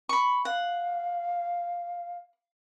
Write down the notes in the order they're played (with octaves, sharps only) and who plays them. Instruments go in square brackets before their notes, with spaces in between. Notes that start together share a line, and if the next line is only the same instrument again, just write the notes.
[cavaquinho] B5 C#6
[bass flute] F5 [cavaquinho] F#5